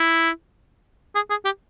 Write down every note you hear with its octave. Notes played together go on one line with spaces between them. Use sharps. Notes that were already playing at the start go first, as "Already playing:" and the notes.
Already playing: E4
G#4
G#4
G4